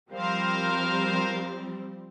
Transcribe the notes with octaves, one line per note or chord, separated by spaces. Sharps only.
F3 G3 C4 A#4 C5 F5